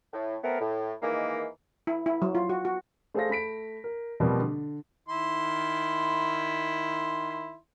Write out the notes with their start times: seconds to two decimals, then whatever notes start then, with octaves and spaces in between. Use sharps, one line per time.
0.13 A2
0.44 A3 B3 C4 A#4
0.61 A2
1.02 D#3 E3 G#3 A#3
1.87 E4
2.06 E4
2.22 F#3
2.35 F4
2.49 F#4
2.65 F#4
3.14 A3 G#4 A4 C5 F5 A#6
3.30 A3 B5 B6 D7
3.84 A#4
4.20 B2 F3 G3 A#3 C4
4.40 D3
5.09 D#3 E4 C6